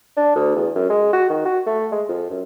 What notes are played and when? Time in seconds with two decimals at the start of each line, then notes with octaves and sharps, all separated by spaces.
0.17 D4
0.35 D2
0.56 E2
0.75 F#2
0.89 G#3
1.13 F#4
1.30 D#3
1.45 F#4
1.66 A3
1.92 G#3
2.08 F2
2.30 F#2